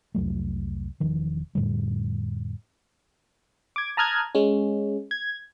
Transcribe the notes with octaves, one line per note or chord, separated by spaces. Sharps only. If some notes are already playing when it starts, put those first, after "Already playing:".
C2 F2 F#3 A3
E1 D#3 F3
F2 A2 D3 G3
D6 G#6
A5 A#5 D#6 F6 F#6 G#6
G#3 C#4
G#6